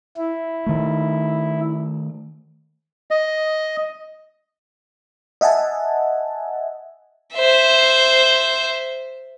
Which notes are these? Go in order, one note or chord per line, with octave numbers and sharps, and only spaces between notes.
E4
D#3 A3
D#5
D#5 E5 F#5 G#5 A5
C5 E5